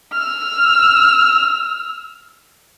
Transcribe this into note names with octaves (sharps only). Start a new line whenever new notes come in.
E6 F6